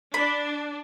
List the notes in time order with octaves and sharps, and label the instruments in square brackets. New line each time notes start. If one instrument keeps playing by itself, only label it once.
[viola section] D4 [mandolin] B5